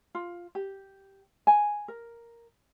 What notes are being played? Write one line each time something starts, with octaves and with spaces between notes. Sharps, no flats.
F4
G4
G#5
A#4